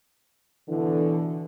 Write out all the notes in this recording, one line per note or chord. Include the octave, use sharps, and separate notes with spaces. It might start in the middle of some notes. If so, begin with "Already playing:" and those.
B2 D3 E3